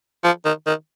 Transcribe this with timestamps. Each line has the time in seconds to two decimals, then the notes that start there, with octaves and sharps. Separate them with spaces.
0.24 F3
0.45 D#3
0.67 D#3